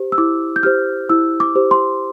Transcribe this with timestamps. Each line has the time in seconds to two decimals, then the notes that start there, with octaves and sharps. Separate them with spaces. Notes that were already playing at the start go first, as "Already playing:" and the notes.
Already playing: G4 C5
0.12 E6
0.18 E4 D6
0.56 G6
0.63 G4 C5 F6
1.09 E4 E6
1.40 D6
1.55 G4 C5
1.71 C6